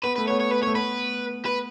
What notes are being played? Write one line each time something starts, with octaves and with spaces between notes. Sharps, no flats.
B3 B4
A3 B4
B3 C#5
C#5
B4
C#5
A3
B3 B4
B4